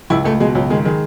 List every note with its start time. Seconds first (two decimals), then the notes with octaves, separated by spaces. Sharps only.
0.10 C#2 E4
0.25 C#2 A3
0.40 B2 G#3
0.55 C#2 F#3
0.70 D#3 G#3
0.85 D#3 G#3